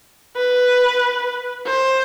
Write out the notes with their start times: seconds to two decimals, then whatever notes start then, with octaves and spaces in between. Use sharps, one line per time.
0.37 B4
1.67 C5